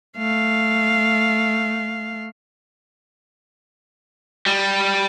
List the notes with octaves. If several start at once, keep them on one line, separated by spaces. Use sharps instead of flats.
A3 F5
G3